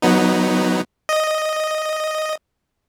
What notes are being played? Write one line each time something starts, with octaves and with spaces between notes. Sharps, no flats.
F#3 B3 D#4
D#5